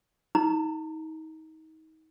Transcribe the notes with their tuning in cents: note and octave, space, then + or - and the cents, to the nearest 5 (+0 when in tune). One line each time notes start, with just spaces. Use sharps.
D#4 +30 A#5 +0